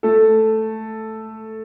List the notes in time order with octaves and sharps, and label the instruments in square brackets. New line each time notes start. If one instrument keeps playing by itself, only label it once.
[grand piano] A3 A4